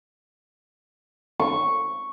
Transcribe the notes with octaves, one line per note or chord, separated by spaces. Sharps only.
C#6